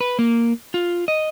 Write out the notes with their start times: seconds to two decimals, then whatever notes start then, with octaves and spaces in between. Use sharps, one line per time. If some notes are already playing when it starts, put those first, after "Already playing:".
0.01 B4
0.19 A#3
0.74 F4
1.08 D#5